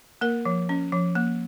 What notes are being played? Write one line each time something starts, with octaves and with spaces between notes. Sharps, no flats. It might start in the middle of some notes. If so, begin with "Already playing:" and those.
A#3 A#4
F3
C#4
F3
A#3